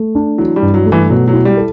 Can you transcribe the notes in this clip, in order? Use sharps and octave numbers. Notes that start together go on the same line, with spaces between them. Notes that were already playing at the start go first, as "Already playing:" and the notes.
Already playing: A3
D4
E3 F#3
G3
G2
F#3
A3
E3
B2 F#3
F#3
E4
G3
A4